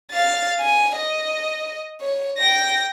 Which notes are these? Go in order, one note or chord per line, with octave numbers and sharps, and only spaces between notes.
F5 A6
G#5
D#5
C#5
G5 A#6